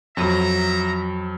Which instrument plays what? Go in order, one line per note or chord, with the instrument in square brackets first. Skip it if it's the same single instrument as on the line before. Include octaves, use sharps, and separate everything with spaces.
[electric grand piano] F2 F#3 D#7 [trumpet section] E5 A#5